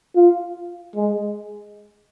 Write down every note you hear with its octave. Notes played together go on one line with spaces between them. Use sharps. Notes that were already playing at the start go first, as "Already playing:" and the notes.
F4
G#3